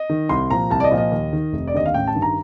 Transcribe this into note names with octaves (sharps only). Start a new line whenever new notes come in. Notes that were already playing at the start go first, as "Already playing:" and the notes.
Already playing: D#5
D#3
C2 C6
A#2 F3 A#5
C2 A5
D5
D#5
A#2 F3
D#5
D#2
D#3
F1
D5
D#2 D3 D#5
F5
A1 G5
A5
G2 D#3
A#5